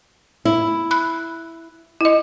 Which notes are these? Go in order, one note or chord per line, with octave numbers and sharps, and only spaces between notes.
E4
B5 F#6
E4 D#5